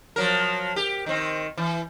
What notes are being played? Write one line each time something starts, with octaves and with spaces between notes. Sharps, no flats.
F3 F#3 A#4
G4
D#3 C4
E3